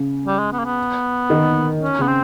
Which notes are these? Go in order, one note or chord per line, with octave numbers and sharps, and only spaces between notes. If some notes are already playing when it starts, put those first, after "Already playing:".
Already playing: C#3
G3
G#3
B3
A#3
B3
D#3
C#4
C#3 B3
C4